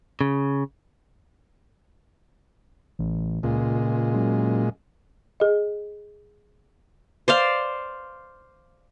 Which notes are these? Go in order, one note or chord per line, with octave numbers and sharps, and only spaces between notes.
C#3
A1
C#2 A#2 G#3
F#2
G#4 D#5
C5 D5 F5